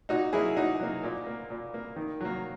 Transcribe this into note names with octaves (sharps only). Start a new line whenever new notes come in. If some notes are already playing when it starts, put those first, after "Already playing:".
A#2 D#4 F#4
F#3 A#3 E4 G#4
A#2 D#4 F#4
F#3 A#3
A#2
A#3
A#2
A#3
D#3
F#3 A#3